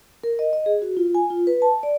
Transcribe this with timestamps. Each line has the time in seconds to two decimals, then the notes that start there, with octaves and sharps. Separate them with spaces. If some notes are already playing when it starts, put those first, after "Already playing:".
0.24 A#4
0.39 D#5
0.53 D#5
0.66 G#4
0.82 F#4
0.97 F4
1.15 G#5
1.30 F4
1.47 B4
1.62 A5
1.83 D5